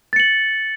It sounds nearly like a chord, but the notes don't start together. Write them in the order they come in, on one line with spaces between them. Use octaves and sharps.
A6 C#7 F#7